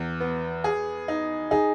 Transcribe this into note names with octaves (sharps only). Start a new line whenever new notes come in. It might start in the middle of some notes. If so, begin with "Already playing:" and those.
Already playing: E2
B3
G#4
D#4
D#4 G#4